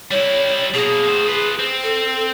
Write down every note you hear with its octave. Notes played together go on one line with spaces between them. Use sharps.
G3 E4 C#5
B2 A#3 G#4
A3 C5
F4 B4
C4
A4